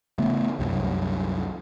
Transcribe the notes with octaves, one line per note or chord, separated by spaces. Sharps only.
C#3 A3 B3
C2 F#2